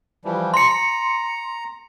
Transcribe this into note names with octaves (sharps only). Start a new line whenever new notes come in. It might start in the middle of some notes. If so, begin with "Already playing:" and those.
E3 F3 G3
A#5 C6 C#7